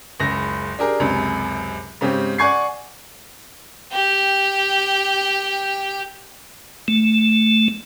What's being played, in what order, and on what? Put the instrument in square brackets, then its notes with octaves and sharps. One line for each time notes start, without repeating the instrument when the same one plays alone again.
[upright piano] F#1 C#2 A#6
D4 G4 G#4 A#4
C#2 F#2 C3
G#2 C#3 C4 C#4 G4
D5 F#5 G#5 C#6 G#6 C7
[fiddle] G4 G5
[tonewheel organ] A3